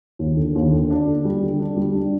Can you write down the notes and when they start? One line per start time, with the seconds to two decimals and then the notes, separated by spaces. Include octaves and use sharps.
0.19 D#2
0.37 D3
0.55 D#2
0.72 D3
0.90 D4
1.07 D3
1.25 G3
1.43 D3
1.60 D4
1.77 G3
1.95 D4